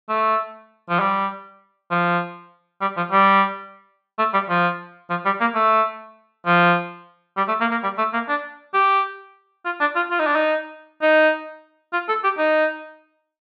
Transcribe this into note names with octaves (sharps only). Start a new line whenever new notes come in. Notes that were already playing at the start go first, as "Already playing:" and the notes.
A3
F3
G3
F3
G3
F3
G3
A3
G3
F3
F3
G3
A#3
A3
F3
G3
A3
A#3
A#3
G3
A3
A#3
D4
G4
F4
D4
F4
F4
D#4
D4
D#4
D#4
F4
A4
G4
D#4